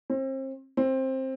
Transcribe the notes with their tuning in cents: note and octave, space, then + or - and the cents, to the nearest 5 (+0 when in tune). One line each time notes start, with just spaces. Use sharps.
C4 +35
C4 +15